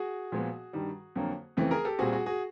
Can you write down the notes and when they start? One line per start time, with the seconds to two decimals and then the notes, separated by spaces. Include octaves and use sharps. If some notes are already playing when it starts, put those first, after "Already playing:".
Already playing: F#4 G#4
0.32 A#2 F3 G#3 B3
0.73 G2 D#3 G3
1.16 F2 D3 F#3 A#3
1.57 F2 C#3 E3 A3 C4
1.71 G#4 A#4
1.85 G4 A4
1.99 A#2 G3 C4 F#4 G#4
2.12 F#4 G#4
2.26 F#4 G#4